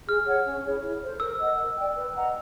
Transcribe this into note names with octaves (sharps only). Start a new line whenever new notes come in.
G#4 F6
C#5 F#5
C#4
E4 G#4 C#5
E4
A4 C5
A#4 E6
D#5 F#5
A#4
D5 G5
B4
D#5 F#5 A#5